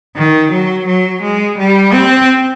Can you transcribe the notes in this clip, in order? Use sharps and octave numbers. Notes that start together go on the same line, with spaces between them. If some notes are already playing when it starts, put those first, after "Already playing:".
D#3
F#3
F#3
G#3
G3
C4